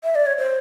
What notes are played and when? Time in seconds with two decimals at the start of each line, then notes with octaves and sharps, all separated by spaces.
0.04 E5
0.15 D5
0.26 C#5
0.38 C5